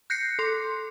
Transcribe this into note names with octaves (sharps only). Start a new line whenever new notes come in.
F#6 G6 A#6 C7 C#7
A4 C6